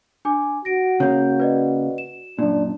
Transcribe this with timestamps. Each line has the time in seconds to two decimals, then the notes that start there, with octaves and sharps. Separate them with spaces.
0.25 D4 G#5 D6
0.65 F#4 A#6 D7
1.00 C#3 A#3 C#5 G6
1.40 B4 D5 D#5
1.98 E7
2.39 F#2 A#2 D4